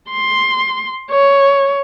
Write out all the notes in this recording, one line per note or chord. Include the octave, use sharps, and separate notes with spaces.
C6
C#5